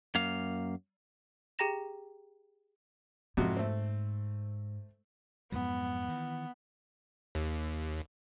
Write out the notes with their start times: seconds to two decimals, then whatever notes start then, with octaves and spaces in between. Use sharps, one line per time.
0.15 F#2 A#3 F5
1.59 G4 G#4 G5 A#5 A#6 E7
3.37 F2 G#2 C3 F#4
3.57 A3 C4
5.52 F2 G#2 F#3 B3
6.08 D#3 E3
7.35 D#2